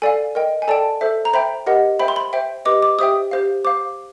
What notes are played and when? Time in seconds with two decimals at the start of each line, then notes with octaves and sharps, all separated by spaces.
0.02 A4 D5 F5 G#5
0.35 A#4 D#5 G5
0.62 G#5
0.68 A4 D5 G5 A5
1.01 A4 C5 E5
1.25 A#5
1.33 C5 E5 G5 B5
1.67 G4 A#4 D#5 F#5
1.99 C5 E5 G5 B5
2.08 C6
2.16 B5
2.33 C5 E5 G5
2.65 G4 B4 D#5 D6
2.82 D6
2.99 G4 C5 E5 G5 D#6
3.31 G4 C5 F5
3.64 C5 F5 D6